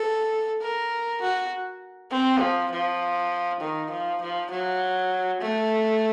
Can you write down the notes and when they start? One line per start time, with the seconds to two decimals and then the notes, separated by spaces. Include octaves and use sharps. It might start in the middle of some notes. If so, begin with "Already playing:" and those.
Already playing: A4
0.62 A#4
1.21 F#4
2.11 C4
2.41 F3
2.71 F3
3.60 D#3
3.91 F3
4.21 F3
4.51 F#3
5.41 A3